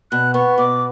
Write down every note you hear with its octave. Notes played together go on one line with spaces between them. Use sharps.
B2 F#6
B3 C#6
B2 D6